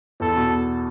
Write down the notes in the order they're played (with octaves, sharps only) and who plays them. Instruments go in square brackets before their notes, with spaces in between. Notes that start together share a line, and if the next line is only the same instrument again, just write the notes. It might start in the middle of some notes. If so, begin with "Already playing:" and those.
[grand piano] E2 [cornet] A4
[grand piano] B2